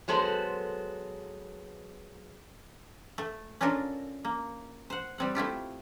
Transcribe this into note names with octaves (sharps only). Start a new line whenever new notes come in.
F#3 G#3 B3 A4 C5
A3
C#4 D4 F4 A4 A#4
A#3
C5 F#5
G3 C4 F#5
A3 E4 F4 G4